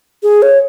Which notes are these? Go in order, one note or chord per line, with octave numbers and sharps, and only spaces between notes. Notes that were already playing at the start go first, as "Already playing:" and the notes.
G#4
C#5